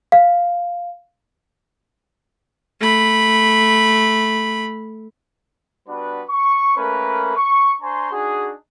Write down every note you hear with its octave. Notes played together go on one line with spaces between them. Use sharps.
F5
A3 B5
G3 B3 D4 F#4 B4
C#6
A3 A#3 C#4 A#4 B4
C#6
D4 C5 G#5 A#5 C6 C#6
D4 D#4 F#4 G#4